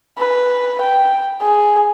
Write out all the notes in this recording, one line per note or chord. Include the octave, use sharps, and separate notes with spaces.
B4
G5
G#4